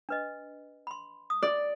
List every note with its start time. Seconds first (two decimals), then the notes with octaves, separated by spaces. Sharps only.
0.09 D4 B4 D#5
0.87 B5 C6
1.30 D#6
1.43 D5